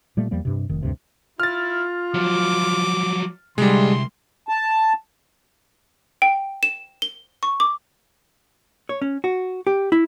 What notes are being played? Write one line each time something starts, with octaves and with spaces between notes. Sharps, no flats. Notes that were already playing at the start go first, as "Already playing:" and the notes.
A#2 G3 A3 A#3
E2 F3 G3 A#3
G2 C3
F1 D#3
D2 G2 C3
E4 F4 F6 A6
F3 F#3 D6
C2 D3 G3 G#3 C6
A5
G5
E7
G7
C#6
D6
C#5
C#4
F#4
G4
E4